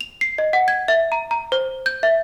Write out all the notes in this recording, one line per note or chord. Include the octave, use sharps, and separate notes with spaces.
F7
C7
D#5
F#5
G#6
E5
A#5
A#5
C5
G6
E5